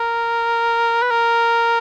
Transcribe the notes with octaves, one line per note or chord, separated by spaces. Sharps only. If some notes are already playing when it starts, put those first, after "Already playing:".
Already playing: A#4
B4
A#4